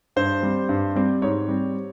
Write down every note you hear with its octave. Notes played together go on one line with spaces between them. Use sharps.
G2 C5
G3 C4
G2
G3 C4
G#2 C#5
G3 C4